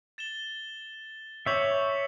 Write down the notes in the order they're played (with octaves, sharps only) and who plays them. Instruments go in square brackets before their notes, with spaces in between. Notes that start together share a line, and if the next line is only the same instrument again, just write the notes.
[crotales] A6 E7 G7
[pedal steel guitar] C#5 E5 [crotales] D6 G6 C#7 F#7